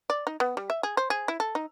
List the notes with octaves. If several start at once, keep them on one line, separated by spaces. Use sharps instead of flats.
D5
D#4
B3
G3
E5
G#4
C5
G#4
E4
A4
D#4